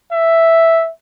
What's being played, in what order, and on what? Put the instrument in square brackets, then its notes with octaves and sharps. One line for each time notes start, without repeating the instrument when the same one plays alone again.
[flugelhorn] E5